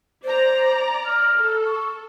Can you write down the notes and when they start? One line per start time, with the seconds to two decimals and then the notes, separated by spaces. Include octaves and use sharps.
0.24 C5 D5 A#5
1.06 F6
1.36 A4
1.66 C#6